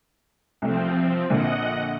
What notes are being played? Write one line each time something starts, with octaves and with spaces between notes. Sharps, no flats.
C2 F3 A3 C4
A#1 D3 A#3 D#5 F#5